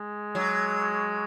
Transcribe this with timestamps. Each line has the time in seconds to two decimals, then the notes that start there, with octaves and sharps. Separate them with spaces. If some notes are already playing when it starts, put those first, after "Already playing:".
Already playing: G#3
0.35 F#3